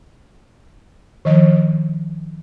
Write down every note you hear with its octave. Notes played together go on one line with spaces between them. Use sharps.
D#3 F3 D#5